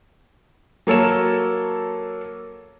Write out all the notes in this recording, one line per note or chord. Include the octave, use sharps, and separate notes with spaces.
F#3 A#3 A4 C#5 E7